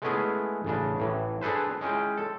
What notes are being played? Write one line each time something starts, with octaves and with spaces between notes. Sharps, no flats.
G#3 A3 B3 C#4 E4 G#4
A1 C#3 D4
A1 A2 E3
D4 G#4 A4 B4 C5
G#3 C#4 E4 G5
A4